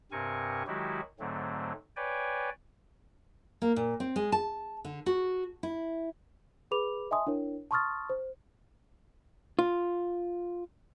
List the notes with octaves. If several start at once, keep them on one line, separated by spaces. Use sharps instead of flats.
G2 C3 C4 A#4 G#5 C#6
D#3 F#3 G#3 E4 F#4 G4
G#2 D3 F#3 A3 C4
B4 C#5 D5 G5 G#5
A#3
A#2
C4
G#3
A5
D3
F#4
E4
G#4 B4 B5 D6 F7
D#5 E5 G#5 A5 C6 D#6
D4 E4 A#4 C#5
A5 C6 C#6 D#6 F6 A6
C5
F4